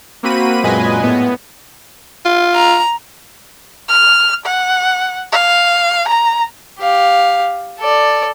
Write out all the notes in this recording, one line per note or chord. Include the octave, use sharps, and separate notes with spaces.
A#3 C4 F#4 B5 D#7
F#2 A#2 G#3 B4 D#5 G#5
A2 B3
F4
A#5
F6
F#5
F5
A#5
G4 F5
A4 D5